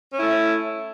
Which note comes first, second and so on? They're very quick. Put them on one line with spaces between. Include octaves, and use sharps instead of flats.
C#4 E4 A3